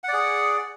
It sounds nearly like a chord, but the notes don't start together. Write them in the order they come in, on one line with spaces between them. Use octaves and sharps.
F#5 D5 G#4